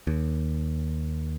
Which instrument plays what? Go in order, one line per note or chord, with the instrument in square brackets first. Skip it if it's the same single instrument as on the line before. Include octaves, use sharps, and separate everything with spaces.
[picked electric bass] D#2